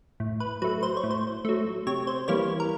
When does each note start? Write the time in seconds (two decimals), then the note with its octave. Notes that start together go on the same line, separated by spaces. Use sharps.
0.20 A2
0.40 B4
0.62 F#3 A3 B4
0.83 C5
0.97 C#5
1.04 A2
1.11 C5
1.45 F#3 A3
1.87 C3 C#5
2.07 C5
2.28 E3 G3 A#3 C#5
2.60 A#4